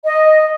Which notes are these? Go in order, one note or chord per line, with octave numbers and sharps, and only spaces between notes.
D#5